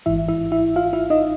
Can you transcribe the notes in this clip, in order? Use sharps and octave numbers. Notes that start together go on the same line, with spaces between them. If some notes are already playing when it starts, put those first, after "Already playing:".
G#1 G#2 E3 E4 E5
E4 E5
E4 E5
F4 F5
E4 E5
D#4 D#5